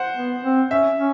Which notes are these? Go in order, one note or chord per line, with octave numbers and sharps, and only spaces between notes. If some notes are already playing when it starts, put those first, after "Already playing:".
Already playing: C5 F#5
B3
C4
C#4 E5
C#4